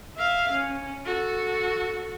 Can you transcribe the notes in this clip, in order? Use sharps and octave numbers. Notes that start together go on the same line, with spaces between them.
E5 F5
C#4
F#4 A4